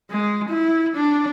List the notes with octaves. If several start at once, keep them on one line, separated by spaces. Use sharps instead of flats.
G#3
E4
D4